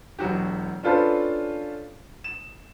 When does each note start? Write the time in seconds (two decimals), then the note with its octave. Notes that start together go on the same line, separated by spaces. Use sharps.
0.19 E1 F#3 F#4 G4
0.83 C#4 D4 F4 A4 B4 C5
2.24 E7